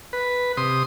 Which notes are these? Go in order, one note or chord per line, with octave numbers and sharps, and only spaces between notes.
B4
C3 C6 D#6